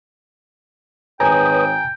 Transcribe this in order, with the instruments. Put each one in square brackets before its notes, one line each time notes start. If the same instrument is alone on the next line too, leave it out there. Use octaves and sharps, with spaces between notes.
[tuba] G#1 [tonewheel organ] B4 C#5 D#6 [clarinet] G5 [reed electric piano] G#5 A#5